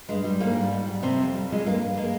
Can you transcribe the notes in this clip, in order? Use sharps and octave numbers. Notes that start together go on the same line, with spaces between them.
G2 G#3
G3
G#2 A#3
G3
G#2
G3
F2 C3 C4
F2
G3
F2 G#3
G2 A#3
G2
G#3 A#3